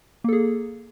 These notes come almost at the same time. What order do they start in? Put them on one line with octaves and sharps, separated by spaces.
A#3 A4 G#4